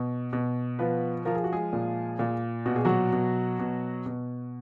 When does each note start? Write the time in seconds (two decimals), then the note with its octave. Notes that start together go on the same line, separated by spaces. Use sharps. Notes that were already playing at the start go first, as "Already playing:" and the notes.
Already playing: B2
0.33 B2
0.79 F3 B3 B4
1.25 F3 A#4
1.35 G#4
1.44 F#4
1.52 G#3 G#4
1.73 A#2
2.19 A#2
2.66 B2 F#4
2.76 G#4
2.85 F#3 F#4
3.13 B2
3.59 B2
4.06 B2